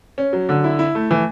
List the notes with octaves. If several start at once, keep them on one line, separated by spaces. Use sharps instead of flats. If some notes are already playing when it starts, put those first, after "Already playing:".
C#4
F#3
D3
E4
E4
A3
E3